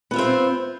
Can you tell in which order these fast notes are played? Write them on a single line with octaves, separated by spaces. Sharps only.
B3 F4 E5 C4 C5